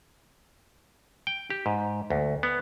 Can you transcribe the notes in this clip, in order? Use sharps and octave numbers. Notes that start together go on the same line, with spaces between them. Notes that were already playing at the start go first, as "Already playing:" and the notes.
G5
G4
G#2
D2
B3